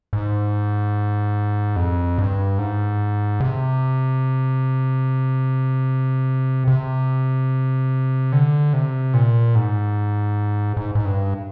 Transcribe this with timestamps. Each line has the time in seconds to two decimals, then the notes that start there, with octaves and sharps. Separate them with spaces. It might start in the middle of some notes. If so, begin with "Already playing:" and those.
0.13 G#2
1.76 F2
2.18 G2
2.59 G#2
3.40 C3
6.68 C3
8.32 D3
8.73 C3
9.14 A#2
9.55 G#2
10.77 G#2
10.95 G#2
11.05 G2